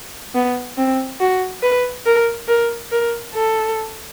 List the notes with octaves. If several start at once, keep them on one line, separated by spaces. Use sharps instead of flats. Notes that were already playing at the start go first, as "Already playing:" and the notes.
B3
C4
F#4
B4
A#4
A#4
A#4
A4